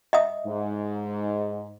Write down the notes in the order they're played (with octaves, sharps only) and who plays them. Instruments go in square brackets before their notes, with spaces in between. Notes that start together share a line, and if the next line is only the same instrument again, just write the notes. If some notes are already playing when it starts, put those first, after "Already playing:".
[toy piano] D#5 E5 D#6
[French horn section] G#2